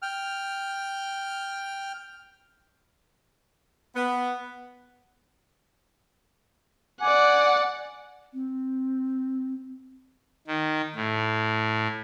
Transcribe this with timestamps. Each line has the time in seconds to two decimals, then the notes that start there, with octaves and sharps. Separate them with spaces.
0.02 G5 F6
3.95 B3
7.01 D5 F#5 G#5 D6
8.34 C4
10.47 D#3
10.95 A2